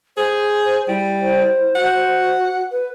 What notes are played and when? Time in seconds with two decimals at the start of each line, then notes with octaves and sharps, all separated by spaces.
0.17 G#4 C5
0.88 G3 E4
1.20 C5
1.75 F#4 F#5
2.72 B4